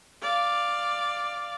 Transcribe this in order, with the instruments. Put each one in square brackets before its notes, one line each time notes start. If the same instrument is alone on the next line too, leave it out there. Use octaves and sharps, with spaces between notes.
[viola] D5 F5